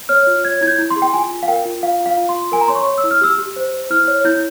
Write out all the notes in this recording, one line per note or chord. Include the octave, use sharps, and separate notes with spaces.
C#5 F6
F4
C#5 G#6
E4 G#6
G6
E4
C6
G#4
G5
F4 G#5
F4
F5
A#4 G5
F4
F4 F5
F4
F5
F4
C6
F4
A#4 G#5
A#5
C#5 C6
C#6
C#5
E6
E4
F6
G4 E6
G4
C5
C5
E4 F6
C#5
E4 G6